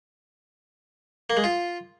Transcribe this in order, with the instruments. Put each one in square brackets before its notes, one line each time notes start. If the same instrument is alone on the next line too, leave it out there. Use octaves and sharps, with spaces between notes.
[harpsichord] A#3
G#3
F4